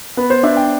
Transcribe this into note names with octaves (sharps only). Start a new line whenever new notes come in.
B3 B4
C5
D4 E5
G5